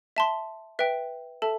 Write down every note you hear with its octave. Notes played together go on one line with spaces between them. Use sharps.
E5 A5 C6
B4 E5 G5
A4 E5 A5